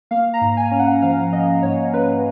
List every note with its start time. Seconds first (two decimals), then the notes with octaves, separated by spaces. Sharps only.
0.11 A#3 F5
0.34 A#5
0.41 G#2
0.57 G#5
0.71 C#4
0.79 F#5
1.02 F3 F5
1.32 A#3 D#5
1.63 G#2 C#5
1.94 C#4 B4